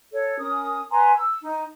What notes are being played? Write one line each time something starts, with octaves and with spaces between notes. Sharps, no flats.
A4 C#5
C#4 A#4 D#6
B4 G#5 A#5 C6
E6
D#4